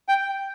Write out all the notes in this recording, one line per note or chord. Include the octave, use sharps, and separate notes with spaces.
G5